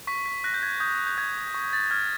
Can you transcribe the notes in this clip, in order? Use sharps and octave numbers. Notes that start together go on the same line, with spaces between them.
C#6 B6
B6
F#6 A#6
G6
G#6
D#6 G6
G6
F#6 G#6
C#6
A6
F6 G#6